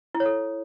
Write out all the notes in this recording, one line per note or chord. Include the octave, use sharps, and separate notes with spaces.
E4
C#5
A4